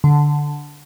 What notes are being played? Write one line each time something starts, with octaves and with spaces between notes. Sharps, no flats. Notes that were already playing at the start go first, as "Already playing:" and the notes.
D3